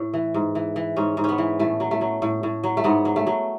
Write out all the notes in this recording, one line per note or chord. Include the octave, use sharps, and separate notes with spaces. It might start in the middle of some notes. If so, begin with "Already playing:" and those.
Already playing: A2
E3
G#2
E3
E3
G#2 C#4
G#2
B3 C#4
E3
A2 A3
F#3
A3
F#3
A2
A2
F#3
A3
G#2 B3
F#3
A3
F#3